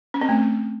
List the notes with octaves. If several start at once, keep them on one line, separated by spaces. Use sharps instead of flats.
C#4
C4
A3